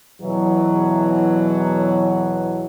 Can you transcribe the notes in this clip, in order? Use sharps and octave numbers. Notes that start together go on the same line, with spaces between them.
E2 B2 E3 F#3